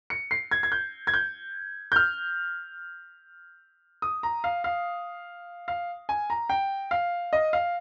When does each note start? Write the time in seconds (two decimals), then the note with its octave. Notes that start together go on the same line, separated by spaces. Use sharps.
0.10 C#7
0.31 C7
0.51 G#6
0.63 G#6
0.72 G6
1.07 G#6
1.14 G6
1.92 G6
1.96 F6
4.02 D#6
4.23 A#5
4.44 F5
4.64 F5
5.68 F5
6.09 G#5
6.30 A#5
6.50 G5
6.91 F5
7.33 D#5
7.53 F5